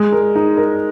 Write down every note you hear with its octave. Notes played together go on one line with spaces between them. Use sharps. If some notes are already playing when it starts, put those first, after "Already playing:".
Already playing: G#3
A#4
D#4
A#4